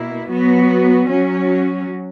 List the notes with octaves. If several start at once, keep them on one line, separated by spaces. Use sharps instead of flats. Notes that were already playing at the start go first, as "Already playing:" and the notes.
Already playing: B2 A#3 E4
F#3 B3 F#4
F#3 C#4 F#4